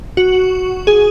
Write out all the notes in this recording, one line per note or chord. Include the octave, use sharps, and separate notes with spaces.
F#4
G#4